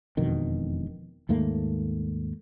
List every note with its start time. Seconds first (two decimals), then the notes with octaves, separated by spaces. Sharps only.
0.17 E1 F2 B2 D#3
1.29 D#2 G#2 A3 A#3